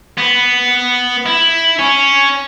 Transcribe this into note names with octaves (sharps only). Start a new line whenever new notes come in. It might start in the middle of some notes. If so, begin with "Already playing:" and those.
B3
E4
C#4